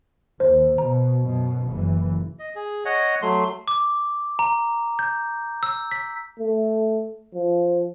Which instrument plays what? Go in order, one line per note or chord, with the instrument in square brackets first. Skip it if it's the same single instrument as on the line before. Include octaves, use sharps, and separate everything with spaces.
[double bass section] D#2 [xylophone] C5
[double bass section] B2 [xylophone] A#5
[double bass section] F#2 B2
F#1 E3
[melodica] D#5
G#4
C#5 D#5 F#5
F#3 A3 C6
[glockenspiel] D6
A#5
G6
E6
B6
[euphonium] A3
F3